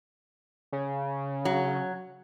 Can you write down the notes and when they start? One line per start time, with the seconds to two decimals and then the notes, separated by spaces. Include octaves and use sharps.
0.72 C#3
1.45 F#3